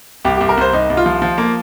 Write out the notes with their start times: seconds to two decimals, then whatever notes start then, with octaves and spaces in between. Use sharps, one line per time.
0.25 C2 G4
0.37 C2 G4
0.49 A#4
0.57 C2 C5
0.73 C2 D#4
0.90 C2
0.97 F4
1.06 F3
1.22 F3
1.38 A#3